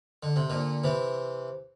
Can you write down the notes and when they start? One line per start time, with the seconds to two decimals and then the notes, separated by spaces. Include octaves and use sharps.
0.23 D3
0.36 C3
0.50 A#2 D3
0.84 C3 E3